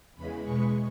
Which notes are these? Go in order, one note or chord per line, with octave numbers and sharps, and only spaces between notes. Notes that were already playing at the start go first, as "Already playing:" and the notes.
E2 C#3 E3 G#3 B5
E2 B2 G#3 C#6